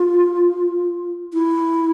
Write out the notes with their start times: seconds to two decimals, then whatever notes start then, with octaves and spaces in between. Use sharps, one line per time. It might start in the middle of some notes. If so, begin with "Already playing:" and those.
Already playing: F4
1.33 E4